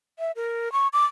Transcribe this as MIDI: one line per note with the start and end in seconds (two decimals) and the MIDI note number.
0.19 0.31 76
0.36 0.72 70
0.72 0.88 85
0.93 1.04 86